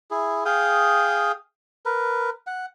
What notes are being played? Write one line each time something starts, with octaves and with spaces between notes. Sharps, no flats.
E4 G#4
G#4 F5 G5 D#6
A#4 B4
F#5